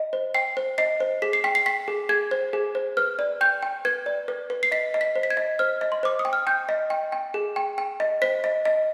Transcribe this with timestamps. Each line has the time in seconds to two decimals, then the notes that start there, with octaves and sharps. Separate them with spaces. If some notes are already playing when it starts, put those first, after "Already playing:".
Already playing: D#5
0.13 C5
0.34 G5 C7
0.57 C5
0.78 D#5 C7
1.00 C5
1.22 G#4 B6
1.33 C7
1.44 G5 B6
1.55 C7
1.66 G5 B6
1.88 G#4
2.09 G#4 G#6
2.31 C5
2.53 G#4
2.75 C5
2.97 B4 F6
3.19 D5
3.41 G5 G6
3.62 G5
3.85 B4 G#6
4.06 D5
4.28 B4
4.50 B4
4.63 C7
4.71 D#5 B6
4.94 D#5
5.01 B6
5.16 C5
5.23 B6
5.30 G#6
5.37 D#5
5.59 C5 F6
5.81 D#5
5.92 C6
6.03 C5 D6
6.19 D#6
6.25 G5
6.33 F6
6.47 G5 G6
6.69 D#5
6.90 G5
7.12 G5
7.34 G#4
7.56 G5
7.78 G5
8.00 D#5
8.22 C5 B6
8.44 D#5
8.65 D#5